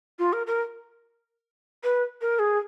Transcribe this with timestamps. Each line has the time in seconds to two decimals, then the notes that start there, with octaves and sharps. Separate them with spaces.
0.19 F4
0.33 A#4
0.47 A#4
1.84 B4
2.21 A#4
2.39 G#4